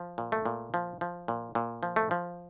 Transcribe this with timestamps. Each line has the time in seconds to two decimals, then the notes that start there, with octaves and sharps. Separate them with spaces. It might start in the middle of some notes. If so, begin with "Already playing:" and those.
Already playing: F3
0.18 A#2
0.32 A3
0.45 A#2
0.74 F3
1.01 F3
1.28 A#2
1.55 A#2
1.83 F3
1.96 A3
2.11 F3